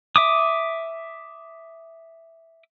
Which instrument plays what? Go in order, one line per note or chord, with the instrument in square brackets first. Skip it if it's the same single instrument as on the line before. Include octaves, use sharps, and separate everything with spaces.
[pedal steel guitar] E5 D6 D#6